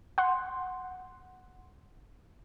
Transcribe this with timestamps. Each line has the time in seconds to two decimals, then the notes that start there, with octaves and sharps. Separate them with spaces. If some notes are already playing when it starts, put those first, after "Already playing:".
0.18 F#5 C6